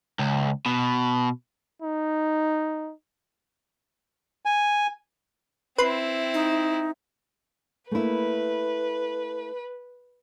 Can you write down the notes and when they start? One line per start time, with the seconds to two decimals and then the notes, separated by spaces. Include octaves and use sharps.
0.19 C#2
0.66 B2
1.83 D#4
4.45 G#5
5.78 C4 E4 B4 C6
6.34 D#4
7.91 A3 A#3 E4 B4